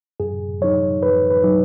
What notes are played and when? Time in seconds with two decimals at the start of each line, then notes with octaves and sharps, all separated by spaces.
0.20 F#2 G#4
0.61 F#3 D#4 C#5
1.03 F#2 B4
1.30 B4
1.44 F#3 D#4